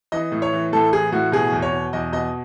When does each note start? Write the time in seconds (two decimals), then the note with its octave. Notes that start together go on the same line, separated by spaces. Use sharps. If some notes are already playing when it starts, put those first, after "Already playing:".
0.12 E3 D#5
0.32 A2
0.42 C#5
0.53 E3
0.73 A2 A4
0.93 E3 G#4
1.12 A2 F#4
1.32 B2 G#4
1.52 E2
1.62 C#5
1.73 B2
1.93 E2 D#5
2.12 B2 D#5